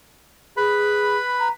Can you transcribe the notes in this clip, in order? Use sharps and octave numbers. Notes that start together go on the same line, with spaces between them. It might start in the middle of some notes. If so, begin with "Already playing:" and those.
G#4 B4 B5
A#5